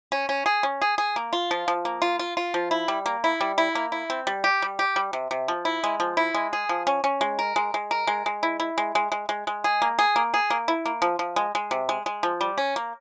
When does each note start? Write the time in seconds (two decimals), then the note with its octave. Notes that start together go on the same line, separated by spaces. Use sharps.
0.12 C#4
0.29 C#4
0.46 G#4
0.63 C#4
0.82 G#4
0.98 G#4
1.16 A#3
1.33 F4
1.51 F3
1.68 F3
1.85 A#3
2.02 F4
2.19 F4
2.37 F4
2.54 F3
2.71 E4
2.88 G3
3.06 A#3
3.24 E4
3.41 G3
3.58 E4
3.75 A#3
3.92 E4
4.10 C4
4.27 G3
4.44 G4
4.62 G3
4.79 G4
4.96 G3
5.13 C3
5.31 C3
5.48 F3
5.65 E4
5.84 G#3
6.00 F3
6.17 E4
6.34 G#3
6.53 G#4
6.69 F3
6.87 C#4
7.04 C#4
7.21 G#3
7.39 A#4
7.56 G#3
7.74 G#3
7.91 A#4
8.07 G#3
8.26 G#3
8.43 E4
8.60 E4
8.78 G#3
8.95 G#3
9.12 G#3
9.29 G#3
9.47 G#3
9.64 G#4
9.82 A#3
9.99 G#4
10.16 A#3
10.34 G#4
10.50 A#3
10.68 E4
10.86 A#3
11.02 F3
11.19 F3
11.36 G#3
11.55 G#3
11.71 C3
11.89 G#3
12.06 G#3
12.23 F3
12.41 G3
12.58 C#4
12.76 A#3